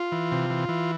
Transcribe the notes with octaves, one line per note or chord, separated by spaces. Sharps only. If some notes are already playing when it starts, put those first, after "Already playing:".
Already playing: F4
E3
C3
E3
E3